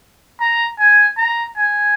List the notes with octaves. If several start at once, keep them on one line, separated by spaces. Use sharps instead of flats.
A#5
G#5
A#5
G#5